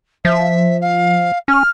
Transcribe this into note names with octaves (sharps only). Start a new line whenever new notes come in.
F3 E5
F5
C#4 F6